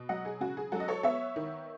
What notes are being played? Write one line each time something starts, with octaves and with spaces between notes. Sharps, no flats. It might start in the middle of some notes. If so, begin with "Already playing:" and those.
Already playing: B2
F#3 D#5 F#5
G#4
C#3 F#4
G#4
F#3 F#4 A4
D#5
A4 C#5
B3 C#5 E5
D#3